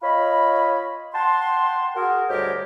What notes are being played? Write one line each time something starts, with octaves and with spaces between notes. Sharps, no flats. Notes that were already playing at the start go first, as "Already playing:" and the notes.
F4 C#5 D#5 B5
F#5 G5 A5 C6
F#4 G#4 A#4
D2 G#2 G3 G4 A#4 C#5